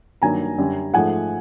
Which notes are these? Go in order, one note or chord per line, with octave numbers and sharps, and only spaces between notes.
G2 D#3 F#3 A#3 G#5 A#5
F#2 D3 G3
G#2 F3 A3 F#5 G#5